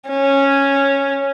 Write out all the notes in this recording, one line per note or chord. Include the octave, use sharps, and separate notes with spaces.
C#4